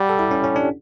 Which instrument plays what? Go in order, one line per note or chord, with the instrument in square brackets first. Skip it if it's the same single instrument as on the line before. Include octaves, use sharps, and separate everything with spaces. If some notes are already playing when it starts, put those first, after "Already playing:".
Already playing: [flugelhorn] G3 [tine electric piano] D5 F#5
[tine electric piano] A4
E4 G4
C#4
C#4
D4